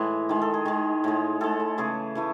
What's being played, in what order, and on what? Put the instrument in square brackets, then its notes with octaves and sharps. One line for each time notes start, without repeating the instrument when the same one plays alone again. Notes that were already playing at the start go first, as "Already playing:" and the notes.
Already playing: [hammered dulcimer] A2 E3 G#3 A4
D#3 G#3
A4
G#4
D#3 G#3
A2 G#3
A2 G#3 A4
E4
C#3 E3 A3 G#4
C#3 E3 A3